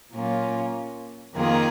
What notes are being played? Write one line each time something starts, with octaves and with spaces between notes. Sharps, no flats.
A#2 F#3 A#3 C#4 F4
F2 D#3 A#3 F4 G#4